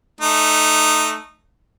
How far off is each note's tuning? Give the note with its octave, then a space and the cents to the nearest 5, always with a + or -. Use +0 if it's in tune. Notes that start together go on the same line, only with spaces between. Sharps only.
A3 -10 D#4 -15